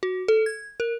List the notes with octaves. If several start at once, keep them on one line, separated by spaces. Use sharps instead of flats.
F#4
A4
G#6
A#4